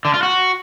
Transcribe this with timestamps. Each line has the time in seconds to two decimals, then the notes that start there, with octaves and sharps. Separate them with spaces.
0.05 D3
0.14 F4
0.23 F#4